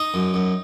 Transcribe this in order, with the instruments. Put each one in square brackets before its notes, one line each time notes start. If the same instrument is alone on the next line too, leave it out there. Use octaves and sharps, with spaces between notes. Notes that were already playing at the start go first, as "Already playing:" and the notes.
Already playing: [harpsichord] D#4 D#5
F#2
F#2